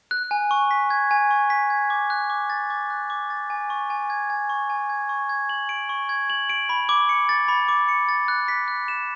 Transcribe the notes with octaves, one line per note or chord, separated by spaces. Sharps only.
F#6
G#5
C#6
B6
G#6
G#5
C#6
B6
G#6
D6
F#6
D6
A6
D6
F#6
D6
A6
G#5
C#6
G#5
G#6
G#5
C#6
G#5
G#6
C#6
G#6
F#7
D7
C#6
G#6
F#7
D7
B5
D6
C#7
A6
B5
D6
C#7
A6
F#6
B6
F#6
E7